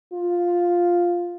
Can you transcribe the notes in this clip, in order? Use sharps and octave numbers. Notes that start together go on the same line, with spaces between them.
F4